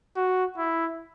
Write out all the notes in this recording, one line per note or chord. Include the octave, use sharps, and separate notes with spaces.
F#4
E4